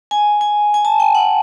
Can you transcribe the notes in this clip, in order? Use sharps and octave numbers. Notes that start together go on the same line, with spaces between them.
G#5
G#5
G#5
A5
G5
F#5